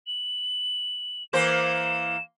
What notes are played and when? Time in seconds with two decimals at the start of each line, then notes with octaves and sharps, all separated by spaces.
0.07 F#7
1.33 E3 A#3 C5 E7